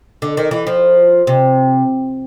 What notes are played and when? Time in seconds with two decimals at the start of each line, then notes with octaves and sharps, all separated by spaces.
0.22 D3
0.37 D#3
0.51 E3
0.67 F3
1.27 C3